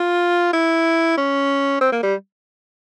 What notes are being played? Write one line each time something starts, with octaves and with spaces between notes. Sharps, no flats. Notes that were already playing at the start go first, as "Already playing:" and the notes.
Already playing: F4
E4
C#4
C4
A#3
G3